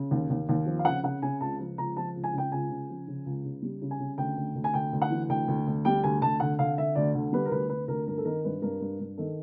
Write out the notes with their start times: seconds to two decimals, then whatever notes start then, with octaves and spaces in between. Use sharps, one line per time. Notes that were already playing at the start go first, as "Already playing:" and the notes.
Already playing: C#3
0.11 D#2
0.30 D#2
0.49 D#2
0.66 F3
0.79 F5
0.85 C#3 F#5
1.03 C#3 F#5
1.22 C#3 G#5
1.41 C#2 A5
1.59 F3
1.78 C#2 A#5
1.97 F3 A5
2.16 C#2
2.24 G#5
2.33 C#3 G5
2.52 C#2 G#5
2.70 C#3
2.90 F3
3.08 C#3
3.26 C#2
3.45 C#3
3.62 G3
3.82 C#3
3.91 G#5
3.99 C#3
4.18 D2 G5
4.37 D2
4.55 D2
4.64 G#5
4.74 D2 G5
4.93 D2
5.02 F#5
5.10 E3
5.29 D2 G5
5.48 D2
5.67 D2
5.85 G3 G5
6.04 D2 G#5
6.22 D2 A5
6.40 D3 F#5
6.59 D3 F5
6.78 D3 E5
6.95 D2 D5
7.15 D3
7.33 G3 B4
7.46 A#4
7.51 D2 B4
7.69 D2 B4
7.88 D2 A#4
8.07 G2 A#4
8.18 A4
8.25 D#3 A#4
8.45 G2 B4
8.62 G2 A#4
8.81 G2
9.00 G2
9.17 D#3 A4